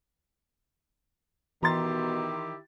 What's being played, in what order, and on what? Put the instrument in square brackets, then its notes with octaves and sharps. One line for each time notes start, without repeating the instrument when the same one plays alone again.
[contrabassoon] B2 [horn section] D#3 E4 G4 [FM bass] E3 [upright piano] A#5 C6 A6